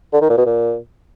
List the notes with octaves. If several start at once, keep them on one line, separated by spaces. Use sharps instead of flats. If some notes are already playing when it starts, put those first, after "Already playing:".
D3
D#3
A#2
B2
A#2